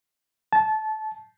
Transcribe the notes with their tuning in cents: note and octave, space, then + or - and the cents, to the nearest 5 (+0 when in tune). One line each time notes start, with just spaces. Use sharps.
A5 -20